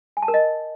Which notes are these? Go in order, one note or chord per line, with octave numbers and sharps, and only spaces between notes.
G#5
A5
A#4
D#5